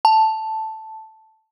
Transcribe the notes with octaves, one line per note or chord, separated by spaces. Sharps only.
A5